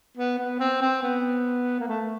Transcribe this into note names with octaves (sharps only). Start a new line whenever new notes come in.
B3
B3
C4
C4
B3
A#3
A3